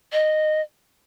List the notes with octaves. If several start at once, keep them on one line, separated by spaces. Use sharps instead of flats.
D#5